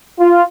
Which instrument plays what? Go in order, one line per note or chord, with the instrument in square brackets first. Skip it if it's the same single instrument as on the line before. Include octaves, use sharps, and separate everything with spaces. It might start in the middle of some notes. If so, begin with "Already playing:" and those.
[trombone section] F4